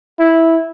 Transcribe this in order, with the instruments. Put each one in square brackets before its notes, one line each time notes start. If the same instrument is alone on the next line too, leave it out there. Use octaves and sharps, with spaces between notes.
[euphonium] E4